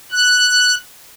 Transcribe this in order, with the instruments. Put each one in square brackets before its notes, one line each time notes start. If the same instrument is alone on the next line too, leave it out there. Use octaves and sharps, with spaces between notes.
[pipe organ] F#6